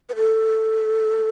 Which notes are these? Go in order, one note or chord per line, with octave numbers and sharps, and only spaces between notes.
B4
A4